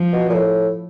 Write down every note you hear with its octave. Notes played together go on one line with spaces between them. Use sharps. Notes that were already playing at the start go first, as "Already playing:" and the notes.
Already playing: F3
B2
A#2
A2